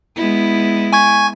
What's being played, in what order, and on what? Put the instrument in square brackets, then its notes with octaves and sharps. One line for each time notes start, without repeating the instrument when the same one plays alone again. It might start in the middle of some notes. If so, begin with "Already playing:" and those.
[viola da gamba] G#3 B3 E4
[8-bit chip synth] G#5 C#6 G#6